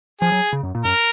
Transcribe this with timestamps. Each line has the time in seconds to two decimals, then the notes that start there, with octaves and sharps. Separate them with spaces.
0.21 F3 G#4
0.32 F#3
0.53 C#3
0.63 F#2
0.75 A#2
0.84 F#2 A#4